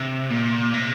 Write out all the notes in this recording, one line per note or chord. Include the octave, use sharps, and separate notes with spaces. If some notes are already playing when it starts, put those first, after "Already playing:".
Already playing: C3
A#2
C3